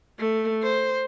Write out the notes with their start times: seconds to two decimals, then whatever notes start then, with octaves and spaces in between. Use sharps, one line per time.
0.19 A3
0.63 C5